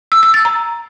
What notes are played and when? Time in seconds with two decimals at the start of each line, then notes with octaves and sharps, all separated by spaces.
0.12 E6
0.23 E6
0.34 A6
0.45 A#5